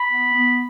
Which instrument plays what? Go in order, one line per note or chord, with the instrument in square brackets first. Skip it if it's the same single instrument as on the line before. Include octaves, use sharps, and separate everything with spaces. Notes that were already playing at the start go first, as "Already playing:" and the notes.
Already playing: [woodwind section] B5
B3
B3